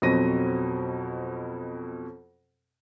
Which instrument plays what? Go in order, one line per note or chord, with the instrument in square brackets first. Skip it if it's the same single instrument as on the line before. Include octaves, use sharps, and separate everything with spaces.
[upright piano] F2 B2 F#3 C4 A#6 D#7